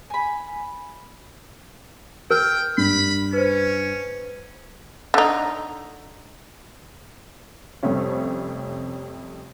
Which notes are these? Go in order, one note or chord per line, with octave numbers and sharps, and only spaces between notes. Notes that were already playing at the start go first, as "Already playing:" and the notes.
G#5 B5
A#4 G5 F6
G2 B5
C#4 B4 C5
D3 D#4
F2 C3 G3 A3 C#4